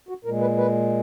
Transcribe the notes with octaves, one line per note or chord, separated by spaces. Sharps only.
F#4
A#2 G#3 A#4
B4
B4